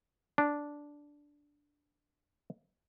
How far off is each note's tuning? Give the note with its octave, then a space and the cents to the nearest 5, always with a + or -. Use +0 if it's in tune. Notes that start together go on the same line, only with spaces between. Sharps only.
D4 -5